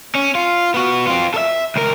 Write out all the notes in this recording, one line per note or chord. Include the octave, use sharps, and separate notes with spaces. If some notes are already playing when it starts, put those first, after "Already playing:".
C#4
F4
B3 F#4
C4 F4
A4 E5
C#2 A#4